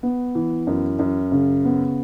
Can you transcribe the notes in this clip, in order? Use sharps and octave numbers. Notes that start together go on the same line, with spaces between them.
B3
E3
F#2
F#2
C#3
B3